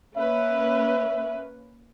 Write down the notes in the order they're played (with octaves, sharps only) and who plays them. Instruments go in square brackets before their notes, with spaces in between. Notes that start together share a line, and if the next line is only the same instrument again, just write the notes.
[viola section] A#3 C#4 B4 [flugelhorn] E5